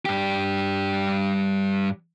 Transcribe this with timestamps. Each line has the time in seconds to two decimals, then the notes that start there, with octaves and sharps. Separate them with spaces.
0.06 G2 G4